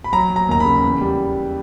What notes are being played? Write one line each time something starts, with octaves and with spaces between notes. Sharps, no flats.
B5
F#3 A#5
F#3
A#5
D#2 A#5
C#3 B5
E2
G3